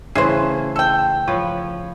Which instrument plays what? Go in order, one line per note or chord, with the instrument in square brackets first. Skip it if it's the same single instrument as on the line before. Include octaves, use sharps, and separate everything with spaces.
[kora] C#3 E3 A3 [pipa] G#4 C5
[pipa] A4 G5
[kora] F3 B4 C#5